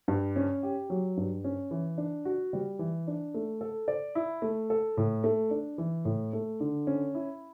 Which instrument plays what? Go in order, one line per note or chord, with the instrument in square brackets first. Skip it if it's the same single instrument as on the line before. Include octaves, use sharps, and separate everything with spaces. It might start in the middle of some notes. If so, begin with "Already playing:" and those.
[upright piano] G2
C#4
G4
F#3
G2
C#4
E3
D4
F#4
G3
E3
D4
A3
A4
D5
E4
A3
A4
A2
A3
D4
E3
A2
A3
D3
C#4
E4